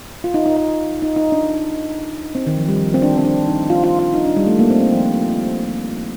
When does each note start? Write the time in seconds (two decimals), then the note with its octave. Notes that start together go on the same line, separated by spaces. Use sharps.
0.24 F4
0.34 D#4
0.46 D#4
0.57 D#4
1.02 D#4
1.16 D#4
1.32 D4
2.35 C4
2.47 D#3
2.58 F3
2.68 G3
2.80 F3
2.94 C4
3.02 D4
3.18 C4
3.25 D4
3.47 D#4
3.70 F4
3.84 F4
3.99 F4
4.14 D#4
4.25 D4
4.37 G3
4.47 A3
4.59 A#3
4.70 C4
4.80 C4
4.92 F3